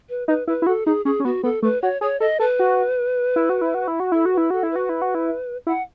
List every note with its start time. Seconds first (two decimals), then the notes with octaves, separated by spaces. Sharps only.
0.09 B4
0.28 D#4 B4
0.47 E4 B4
0.62 E4
0.66 F#4 A4
0.86 D#4 G#4
1.05 C#4 G#4
1.20 C#4
1.24 B3 F#4
1.43 B3 A4
1.62 A3 B4
1.82 F#4 C#5
2.01 G#4 C#5
2.20 A4 D#5
2.40 A4 B4
2.59 F#4
3.36 E4
3.49 F#4
3.61 E4
3.74 F#4
3.88 E4
4.00 F#4
4.12 E4 A4
4.25 F#4
4.32 B4
4.37 E4
4.50 F#4 A4
4.63 E4
4.71 F#4 B4
4.89 E4
5.02 F#4
5.15 E4
5.67 E4 F#5